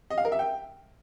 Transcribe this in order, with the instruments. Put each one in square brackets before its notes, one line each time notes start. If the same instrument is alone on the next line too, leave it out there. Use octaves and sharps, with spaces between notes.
[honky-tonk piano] D#5
F5
A#4
E5
G5